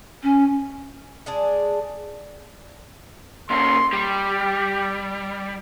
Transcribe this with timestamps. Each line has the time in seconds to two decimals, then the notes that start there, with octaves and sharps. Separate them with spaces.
0.23 C#4
1.26 G#3 D4 G#4
3.50 A#2 C#4 C6
3.93 G3 G4